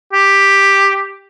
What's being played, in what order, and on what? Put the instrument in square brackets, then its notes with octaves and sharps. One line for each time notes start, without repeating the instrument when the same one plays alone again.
[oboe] G4